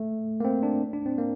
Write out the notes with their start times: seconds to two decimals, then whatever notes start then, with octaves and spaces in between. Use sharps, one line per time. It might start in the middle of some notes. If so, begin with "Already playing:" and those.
Already playing: A3
0.40 A#3
0.45 C4
0.63 D4
0.93 D4
1.06 C4
1.18 A#3